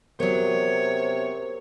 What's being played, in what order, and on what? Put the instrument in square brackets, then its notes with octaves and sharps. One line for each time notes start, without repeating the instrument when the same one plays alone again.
[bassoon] C3 [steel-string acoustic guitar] F#3 B3 [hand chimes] A#4 [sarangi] C#5